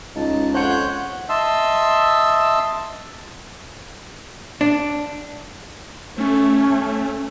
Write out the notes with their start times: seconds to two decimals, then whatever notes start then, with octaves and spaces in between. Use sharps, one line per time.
0.16 C#2 D#4 A5
0.54 F2 C5 C#5 F#5 F#6 G6
1.29 D#5 E5 A5 C6 E6
4.61 D4
6.18 A3 C#4